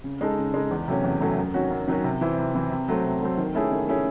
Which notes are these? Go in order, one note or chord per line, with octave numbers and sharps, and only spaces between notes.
C#3
G#3 D#4 A4
C#3
G#3 D#4 A4
E2
C3 F#3 A3 C#4
E2
C3 F#3 A3 C#4
F#2
D#3 F#3 C#4 F#4
F#2
D#3 F#3 C#4 F#4
C3
E3 C4 E4
C3
E3 C4 E4
C3
F#3 A3 C4
C3
F#3 A3 C4
D#3
A3 C#4 E4 G#4
D#3
A3 C#4 E4 G#4